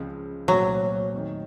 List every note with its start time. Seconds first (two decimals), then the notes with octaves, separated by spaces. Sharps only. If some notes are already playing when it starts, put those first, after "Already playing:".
Already playing: C#2 C#3 F3 C4
0.48 C2 A#2 F#3 A3 C4
1.13 F2 D#3 A3